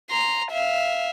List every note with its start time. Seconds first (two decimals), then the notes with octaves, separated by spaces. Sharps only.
0.10 A#5 C6
0.52 E5 F5